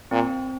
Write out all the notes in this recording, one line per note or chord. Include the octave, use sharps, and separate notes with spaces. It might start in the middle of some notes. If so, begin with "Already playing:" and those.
A#2 C4